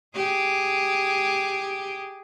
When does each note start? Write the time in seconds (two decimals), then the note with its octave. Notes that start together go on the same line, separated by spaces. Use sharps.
0.15 G4 G#4